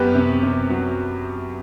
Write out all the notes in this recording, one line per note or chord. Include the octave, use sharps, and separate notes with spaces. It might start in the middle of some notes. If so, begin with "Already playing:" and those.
Already playing: F#2 B3 G4 B4
C3
C3
F#3